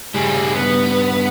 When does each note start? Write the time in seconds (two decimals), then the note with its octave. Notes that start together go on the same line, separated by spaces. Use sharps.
0.14 G2 C#3 G3 G#4
0.54 B3